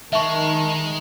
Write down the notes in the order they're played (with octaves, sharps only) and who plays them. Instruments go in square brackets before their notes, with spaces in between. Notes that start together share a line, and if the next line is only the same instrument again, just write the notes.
[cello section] D#3 [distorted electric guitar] G#3 [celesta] E5 C#6 [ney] A5